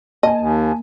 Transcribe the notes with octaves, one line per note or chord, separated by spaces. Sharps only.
A#3 D#5 G#5 A5
D#2